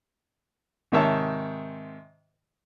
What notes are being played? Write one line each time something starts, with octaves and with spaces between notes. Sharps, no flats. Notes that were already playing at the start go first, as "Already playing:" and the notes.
G#2 C3 D#3 C#5 E5 A5